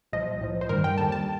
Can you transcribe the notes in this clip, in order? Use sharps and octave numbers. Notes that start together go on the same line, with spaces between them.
C2 A#2 F3 D#5
A2 F3
C5
G2 D#3 G3 A#4
G5
D#2 D3 G3 A5
A5